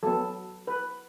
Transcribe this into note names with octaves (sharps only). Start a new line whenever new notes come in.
F#3 B3 A4
B4